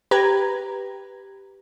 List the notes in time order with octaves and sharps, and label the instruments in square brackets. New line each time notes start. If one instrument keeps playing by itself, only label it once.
[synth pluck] G4 B4 A#5 G#6